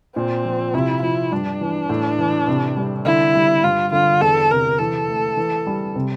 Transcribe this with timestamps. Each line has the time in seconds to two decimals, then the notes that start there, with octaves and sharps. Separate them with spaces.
0.16 A#2 C4
0.45 F3
0.74 C3 E4
1.02 F3 E4
1.32 G2 D4
1.61 E3
1.89 A2
2.19 E3
2.48 C3
2.77 G3
3.05 D3 E4
3.35 G3
3.64 G2 F4
3.92 D3 F4
4.21 E2 A4
4.51 C3 A#4
4.79 E3 A4
5.08 A3
5.37 E3
5.66 G3
5.95 C3